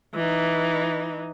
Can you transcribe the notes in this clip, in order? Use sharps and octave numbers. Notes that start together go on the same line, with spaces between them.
E3 D#4